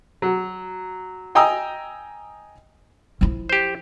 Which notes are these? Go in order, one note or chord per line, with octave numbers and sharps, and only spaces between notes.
F#3
D#5 G5 G#5 A#5 D#6 E6
F3 E4
G4 C5